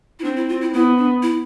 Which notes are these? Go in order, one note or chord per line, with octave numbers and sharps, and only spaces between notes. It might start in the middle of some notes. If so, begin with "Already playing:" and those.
E4
C4 D4
E4
F4
E4
B3 E4
D4
E4